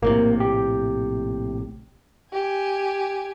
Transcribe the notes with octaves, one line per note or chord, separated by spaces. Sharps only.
A#1 A2 C3 A#3
G4
G4 G#5